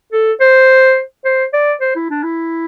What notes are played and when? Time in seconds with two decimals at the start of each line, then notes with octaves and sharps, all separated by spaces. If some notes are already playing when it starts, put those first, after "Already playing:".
0.13 A4
0.40 C5
1.25 C5
1.53 D5
1.81 C5
1.96 E4
2.10 D4
2.24 E4